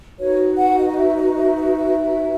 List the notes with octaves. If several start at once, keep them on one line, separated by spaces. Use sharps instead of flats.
D#4 F#4 B4 C#5
F#5
D#5
D#5
E5
D#5
E5
E5
E5